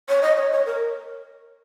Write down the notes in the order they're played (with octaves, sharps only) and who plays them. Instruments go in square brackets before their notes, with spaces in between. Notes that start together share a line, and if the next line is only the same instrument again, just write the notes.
[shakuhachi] C#5
D#5
C#5
C#5
A#4